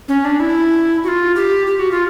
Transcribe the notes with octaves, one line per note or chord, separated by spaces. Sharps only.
C#4
D4
E4
F#4
F4
G4
G4
F#4
F4